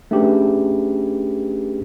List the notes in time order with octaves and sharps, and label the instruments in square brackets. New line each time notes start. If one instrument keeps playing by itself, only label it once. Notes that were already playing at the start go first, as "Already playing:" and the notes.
[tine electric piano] A3 C#4 D4 G4 G#4 B4